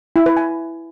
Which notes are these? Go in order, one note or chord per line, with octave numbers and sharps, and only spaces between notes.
E4
B4
G#5